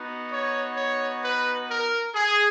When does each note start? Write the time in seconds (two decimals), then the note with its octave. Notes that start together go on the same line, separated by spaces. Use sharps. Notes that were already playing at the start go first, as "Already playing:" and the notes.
Already playing: B3 D#4 F#4
0.31 C#5
0.77 C#5
1.23 B4
1.69 A#4
2.15 G#4